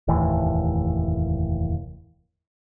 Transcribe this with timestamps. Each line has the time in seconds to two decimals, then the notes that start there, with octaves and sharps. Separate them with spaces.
0.08 F1 D#2 A2 E3